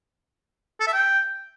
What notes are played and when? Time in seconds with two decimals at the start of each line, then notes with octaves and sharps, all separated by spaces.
0.81 A4
0.87 E5
0.94 G5